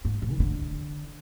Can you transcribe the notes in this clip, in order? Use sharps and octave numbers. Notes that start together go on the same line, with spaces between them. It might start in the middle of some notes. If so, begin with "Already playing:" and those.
G#2
A2
E3
D3